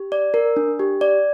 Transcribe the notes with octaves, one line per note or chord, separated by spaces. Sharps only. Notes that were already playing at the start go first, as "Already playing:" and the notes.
Already playing: G4
D5
A#4
D4
G4
D5